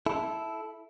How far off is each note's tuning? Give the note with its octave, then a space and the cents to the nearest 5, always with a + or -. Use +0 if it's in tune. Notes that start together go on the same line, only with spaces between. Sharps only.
E4 +0 A4 -15